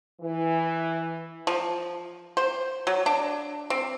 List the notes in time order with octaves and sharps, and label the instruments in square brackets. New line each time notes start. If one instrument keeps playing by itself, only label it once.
[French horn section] E3
[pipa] F3
C5
F#3
D4
C4